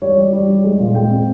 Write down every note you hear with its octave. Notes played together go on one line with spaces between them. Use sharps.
G3 C#5
G3
G3
G3
G#3
A#2
G#3 G5
C4